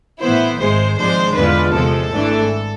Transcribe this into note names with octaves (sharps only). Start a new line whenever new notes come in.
A2 E3 B3 E4 C5
G#1 G#2 G#3 C5
G#1 G#2 F3 G#3 D4 C5
E2 D3 G#3 D4 F4 B4
E2 C3 F3 G#3 A4
G#1 G#2 E3 A3 D4